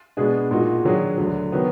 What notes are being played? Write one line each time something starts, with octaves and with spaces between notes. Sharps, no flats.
B2 G#3 B3 D4 G#4
A#2 G#3 D#4 F#4
D#3 F#3 D4 G#4
D2 D3 F#3
D#3 F#3 B3